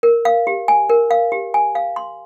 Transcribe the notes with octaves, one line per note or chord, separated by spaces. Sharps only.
A#4
F5
G4
G#5
A#4
F5
G4
G#5
F5
C6